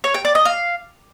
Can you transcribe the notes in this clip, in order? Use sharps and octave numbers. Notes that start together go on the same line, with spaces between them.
C#5
G5
D5
D#5
F5